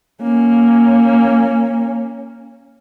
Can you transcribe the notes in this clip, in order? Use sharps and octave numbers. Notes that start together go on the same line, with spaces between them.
A#3 C#4